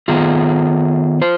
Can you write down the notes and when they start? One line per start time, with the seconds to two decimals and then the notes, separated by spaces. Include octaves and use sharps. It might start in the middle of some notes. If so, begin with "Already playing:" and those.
0.08 D#3 B3 F4 G#4
1.22 F4 C5